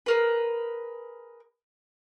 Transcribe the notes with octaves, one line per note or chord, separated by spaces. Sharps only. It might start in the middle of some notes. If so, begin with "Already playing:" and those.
G#4 A#4 B4